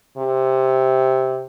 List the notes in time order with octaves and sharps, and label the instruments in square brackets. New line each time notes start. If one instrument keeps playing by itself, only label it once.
[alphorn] C3